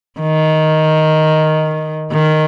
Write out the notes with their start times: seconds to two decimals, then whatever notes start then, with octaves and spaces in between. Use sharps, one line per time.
0.20 D#3
2.12 D#3